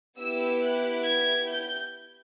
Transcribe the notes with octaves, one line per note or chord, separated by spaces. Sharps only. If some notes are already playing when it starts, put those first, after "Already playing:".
B3 E4 G4 E6
F#6
G#6
G6